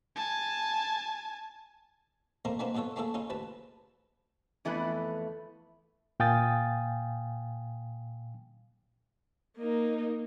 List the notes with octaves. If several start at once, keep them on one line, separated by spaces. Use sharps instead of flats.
G#5 A5
A3 A#3 C4 D#4 A#4
D3 E3 A#3 C4 D4 D#4
F#2 B2 F4 A4 C#5
A3 A#3 C#4 E4 G#4 A4
C#3 C#4 D#4 F4
A1 D2 B4 A5
F2 E3 A3 B3 E4 B4
A#2 F5 G5 G#5 D#6 A6
A#3 D#4